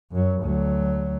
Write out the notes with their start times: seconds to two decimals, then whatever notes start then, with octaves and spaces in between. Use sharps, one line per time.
0.12 F#2 F#3
0.42 D2 F#3